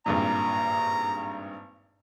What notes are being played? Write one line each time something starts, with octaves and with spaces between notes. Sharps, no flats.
G#1 G2 A#2 A#5